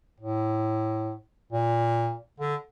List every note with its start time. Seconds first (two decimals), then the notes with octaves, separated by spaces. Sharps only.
0.20 A2
1.52 A#2
2.40 D3